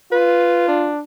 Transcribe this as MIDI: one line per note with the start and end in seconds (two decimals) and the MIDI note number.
0.12 0.91 65
0.12 0.67 71
0.68 1.01 62